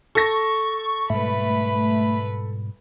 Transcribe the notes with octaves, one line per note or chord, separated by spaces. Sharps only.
A4 C#6 A#6
G#2 B2 G3 A3 B4 B5